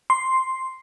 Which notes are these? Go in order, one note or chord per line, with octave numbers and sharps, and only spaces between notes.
C6